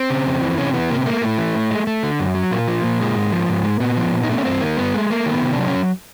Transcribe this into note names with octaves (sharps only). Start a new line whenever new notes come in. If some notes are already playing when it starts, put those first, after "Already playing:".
Already playing: C4
C#3
F2
E3
C3 C#4
E3 B3
C3 A#3
B3
A3 A#3
A2 A3
E3
A2
G#3
A3
D3
F#2
F#3
A#2 A#3
F3
A#2
G#3
G#2
F3
G#2
G#3
A#2 B3
F3
A#2
D#4
A3 D4
C#4
G2 C4
D#3 A#3
G2 B3
G#3 A3
A3 A#3
D#3
B3
C3
D4
F#3
C#4